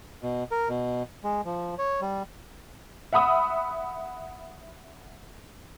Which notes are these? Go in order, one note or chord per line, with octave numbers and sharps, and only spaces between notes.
B2
A#4
B2
G#3
F3
C#5
G3
E5 F#5 B5 D#6 E6